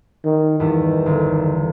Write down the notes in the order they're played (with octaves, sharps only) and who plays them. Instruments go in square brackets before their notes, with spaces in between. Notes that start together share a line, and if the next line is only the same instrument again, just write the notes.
[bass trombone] D#3
[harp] E2 G2 [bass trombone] D#3
[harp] G1